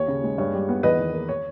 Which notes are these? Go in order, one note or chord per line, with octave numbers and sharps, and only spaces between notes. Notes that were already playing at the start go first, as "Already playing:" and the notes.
Already playing: D#2 C#5
C#3
G#3
G2 C#5
G3
B3
E2 B4 D#5
D#3
A#3
C#5